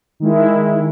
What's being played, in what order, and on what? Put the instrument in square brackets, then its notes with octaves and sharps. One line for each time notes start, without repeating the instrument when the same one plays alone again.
[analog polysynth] D#3 G#3 E4